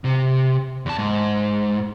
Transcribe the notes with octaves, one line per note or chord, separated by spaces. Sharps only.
C3
E2 A5
G#2